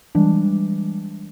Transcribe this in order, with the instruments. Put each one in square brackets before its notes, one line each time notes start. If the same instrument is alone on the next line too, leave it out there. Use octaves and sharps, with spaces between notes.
[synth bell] E3 G3 G#3 D4